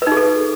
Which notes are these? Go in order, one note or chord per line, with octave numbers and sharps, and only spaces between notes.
D#4 G#4 A4 B4